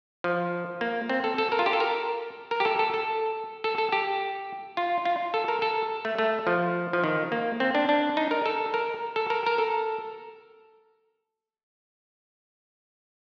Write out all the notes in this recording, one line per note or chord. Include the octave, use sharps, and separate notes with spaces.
F3
A#3
C4
A4
A4
A#4
F4
G4
A4
A#4
A#4
G4
A4
A4
A4
A4
A4
G4
F4
F4
A4
A#4
A4
A3
A3
F3
F3
D#3
A#3
C4
D4
D4
D#4
A#4
A4
A#4
A4
A#4
A#4
A4